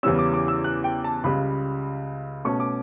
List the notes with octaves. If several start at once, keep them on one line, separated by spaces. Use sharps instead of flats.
E2 C#3 E3 G3 C#4 E6
D6
D6
E6
F#6
G5
A5
C#2 C#3 G3 B5
B2 A3 C#4 C#6
D6